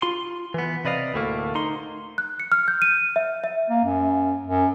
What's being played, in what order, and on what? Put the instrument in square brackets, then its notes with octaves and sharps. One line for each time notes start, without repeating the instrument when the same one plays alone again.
[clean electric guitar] F4 C6
E3 B3
C3 B4 D5 D#5 F5
D2 A2 A3 A#3
D#4 C6
[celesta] F#6
C#7
F6
G6
D#7
E5
E5
[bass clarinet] A#3
F#2
F#2